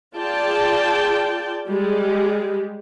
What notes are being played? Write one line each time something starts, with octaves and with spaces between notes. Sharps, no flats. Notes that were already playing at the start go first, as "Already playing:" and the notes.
F4 G#4 D5 G5 A5
G3 G#3 G4